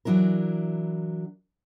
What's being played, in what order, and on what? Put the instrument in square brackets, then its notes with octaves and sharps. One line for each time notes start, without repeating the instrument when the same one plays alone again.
[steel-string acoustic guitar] E3 F#3 D4 E4 A#4